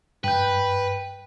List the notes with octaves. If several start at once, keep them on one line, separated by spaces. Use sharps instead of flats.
G2 B4 G5 G6